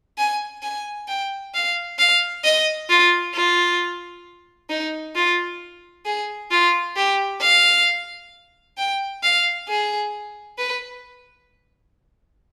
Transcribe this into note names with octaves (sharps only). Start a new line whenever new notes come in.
G#5
G#5
G5
F5
F5
D#5
F4
F4
D#4
F4
G#4
F4
G4
F5
G5
F5
G#4
B4